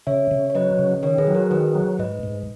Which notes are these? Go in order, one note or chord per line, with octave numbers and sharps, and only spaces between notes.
C#3 C#5 E5
C#3
C#5
F#3 B4 D#5
C#3
D#3 A#4 C#5
G#4 B4
F#3
F#4 A#4
D#3 G#4 B4
F#3
G#2 B4 D#5
G#2